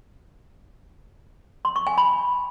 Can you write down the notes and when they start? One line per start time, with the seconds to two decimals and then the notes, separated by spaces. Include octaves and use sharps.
1.65 C6
1.76 C#6
1.87 G#5
1.98 B5